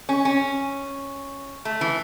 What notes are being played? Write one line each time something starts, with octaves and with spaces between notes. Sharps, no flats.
C#4
C#4
A3
E3